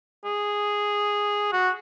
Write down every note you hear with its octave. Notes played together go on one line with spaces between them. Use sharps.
G#4
F#4